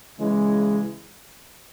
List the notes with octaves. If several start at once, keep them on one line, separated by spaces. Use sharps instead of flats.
C#3 E3 G#3